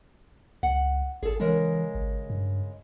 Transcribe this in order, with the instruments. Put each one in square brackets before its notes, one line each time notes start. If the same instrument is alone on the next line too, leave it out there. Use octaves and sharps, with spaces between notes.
[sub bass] C#2 [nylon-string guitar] F#5
[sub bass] G#1 [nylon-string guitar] G#4 A4
[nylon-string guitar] C#3 G#3 A#4 [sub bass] E3
[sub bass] G#1
G2